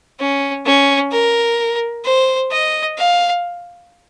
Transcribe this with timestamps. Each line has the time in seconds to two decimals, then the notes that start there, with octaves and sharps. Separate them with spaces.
0.19 C#4
0.66 C#4
1.12 A#4
2.05 C5
2.51 D#5
2.98 F5